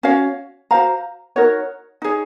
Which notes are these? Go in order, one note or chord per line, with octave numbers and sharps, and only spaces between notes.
C#4 F#4 C#5 F5
F#4 C5 F5 A#5
D#4 F#4 A#4 C#5
D#4 G#4 C#5